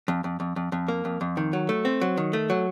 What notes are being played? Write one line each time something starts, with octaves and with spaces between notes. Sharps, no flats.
F2
F2
F2
F2
F2
A#3
F2
F2
D#3
F#3
A3
C4
F#3
D#3
A3
F#3